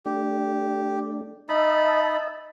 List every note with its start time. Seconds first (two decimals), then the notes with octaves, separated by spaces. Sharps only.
0.06 A3 D4 G4
1.49 D#4 D#5 E5 A5 B5